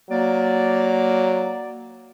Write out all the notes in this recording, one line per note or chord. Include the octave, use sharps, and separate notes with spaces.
F#3 A#3 D5